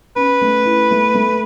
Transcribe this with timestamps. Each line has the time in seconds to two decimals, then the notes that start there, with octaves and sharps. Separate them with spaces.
0.16 C#4 B4
0.41 A3
0.66 E4
0.91 A3
1.14 A3